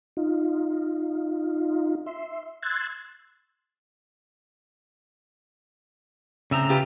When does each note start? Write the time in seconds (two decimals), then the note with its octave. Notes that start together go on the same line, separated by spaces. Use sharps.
0.17 D#4 F4
2.06 E5 C6
2.63 C6 E6 F#6 G#6 A6
6.51 A2 C#3 C4 E5 A#5
6.69 F4 G4 B4